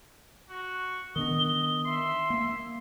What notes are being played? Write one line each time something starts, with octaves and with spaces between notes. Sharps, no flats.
F#4
D#3 B3 D4 D#5 G7
E5 C6
A#3